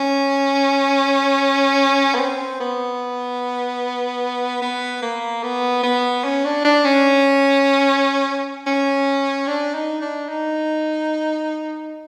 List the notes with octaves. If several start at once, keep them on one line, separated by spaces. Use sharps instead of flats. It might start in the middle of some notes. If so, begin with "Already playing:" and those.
Already playing: C#4
B3
C4
B3
B3
A#3
B3
B3
C#4
D4
D4
C#4
C#4
D4
D#4
D4
D#4